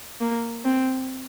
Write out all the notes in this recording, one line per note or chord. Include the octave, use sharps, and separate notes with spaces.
A#3
C4